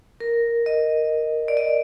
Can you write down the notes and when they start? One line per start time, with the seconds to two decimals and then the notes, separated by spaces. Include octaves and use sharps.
0.20 A#4
0.66 D#5
1.48 D5
1.57 D#5